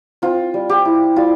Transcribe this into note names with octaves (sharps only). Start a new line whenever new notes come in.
C4 F4
G3
G4
E4
G3 F4